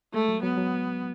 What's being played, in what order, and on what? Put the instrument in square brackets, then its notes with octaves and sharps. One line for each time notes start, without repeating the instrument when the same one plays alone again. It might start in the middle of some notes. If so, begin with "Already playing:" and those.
[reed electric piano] G#3 [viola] A3
[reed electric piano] F#3
[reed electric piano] F#3 [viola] B3
[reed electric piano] F#3